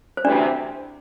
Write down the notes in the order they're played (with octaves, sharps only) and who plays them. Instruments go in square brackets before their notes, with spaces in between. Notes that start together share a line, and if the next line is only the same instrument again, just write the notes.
[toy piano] C5
[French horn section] D2 C3 E3 [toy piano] D4 D5